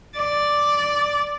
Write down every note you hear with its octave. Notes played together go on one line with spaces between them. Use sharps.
D5